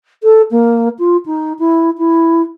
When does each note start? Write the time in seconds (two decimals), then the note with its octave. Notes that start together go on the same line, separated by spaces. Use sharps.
0.23 A4
0.51 A#3
0.99 F4
1.26 D#4
1.59 E4
1.98 E4